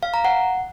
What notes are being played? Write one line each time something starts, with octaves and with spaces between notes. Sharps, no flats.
F5
A#5
F#5